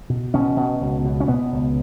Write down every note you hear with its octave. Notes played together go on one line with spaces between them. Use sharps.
B2
B2 C#4
B2
C#2
B2
C#4
B2 B3
C#2